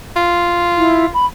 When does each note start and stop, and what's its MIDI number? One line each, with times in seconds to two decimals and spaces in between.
0.16 1.10 65
0.77 1.06 64
1.14 1.26 83